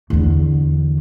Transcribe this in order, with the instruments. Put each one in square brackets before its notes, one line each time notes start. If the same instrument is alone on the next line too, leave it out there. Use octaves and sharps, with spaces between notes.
[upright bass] E2 D3